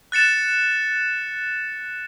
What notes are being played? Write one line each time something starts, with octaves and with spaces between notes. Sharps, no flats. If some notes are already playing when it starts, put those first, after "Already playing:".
F#6 A6 C#7 E7